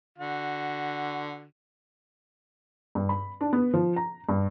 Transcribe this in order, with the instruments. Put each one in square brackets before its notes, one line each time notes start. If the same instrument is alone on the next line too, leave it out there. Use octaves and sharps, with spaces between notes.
[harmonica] D3 F#4
[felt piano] G2
B5
D4
B3
F3
A#5
G2